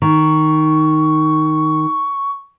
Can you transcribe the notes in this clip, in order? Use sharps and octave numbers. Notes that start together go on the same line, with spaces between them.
D#3 C#6